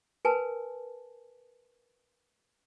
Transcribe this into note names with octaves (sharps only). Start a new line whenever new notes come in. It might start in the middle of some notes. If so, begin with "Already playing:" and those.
A#4 B4 G#5 A5